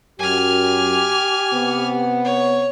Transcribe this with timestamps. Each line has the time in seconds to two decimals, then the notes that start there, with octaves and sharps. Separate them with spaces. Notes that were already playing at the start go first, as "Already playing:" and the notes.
0.19 F#2 G4 G#5 F6
1.53 C3 B3
2.25 C#5